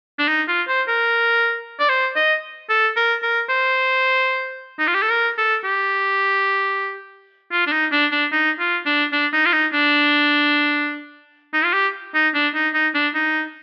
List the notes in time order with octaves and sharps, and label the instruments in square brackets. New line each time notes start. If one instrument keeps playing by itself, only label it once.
[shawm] D4
D#4
F4
C5
A#4
D5
C5
D#5
A4
A#4
A#4
C5
D#4
F4
G4
A4
A#4
A4
G4
F4
D4
D#4
D4
D4
D#4
F4
D4
D4
D#4
F4
D#4
D4
D#4
F4
G4
D#4
D4
D#4
D#4
D4
D#4